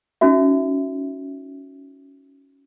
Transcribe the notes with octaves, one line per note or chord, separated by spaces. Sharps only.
C#4 D#4 F#4 E5